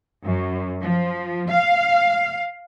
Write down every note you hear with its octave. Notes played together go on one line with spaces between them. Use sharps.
F#2
F3
F5